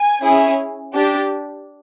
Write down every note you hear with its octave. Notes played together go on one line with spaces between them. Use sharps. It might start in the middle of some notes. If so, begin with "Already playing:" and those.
Already playing: G#5
C#4 E4 G#4
D4 G4